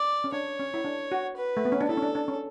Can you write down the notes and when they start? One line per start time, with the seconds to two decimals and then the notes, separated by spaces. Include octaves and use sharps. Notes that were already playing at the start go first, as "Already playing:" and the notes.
Already playing: D5
0.24 C#4
0.32 D4 C#5
0.59 C#4
0.74 E4
0.85 D4
1.12 F#4
1.37 B4
1.57 A3
1.65 B3
1.72 C#4
1.81 D4
1.89 E4 A4
1.97 C#4
2.02 D4
2.15 D4
2.28 C#4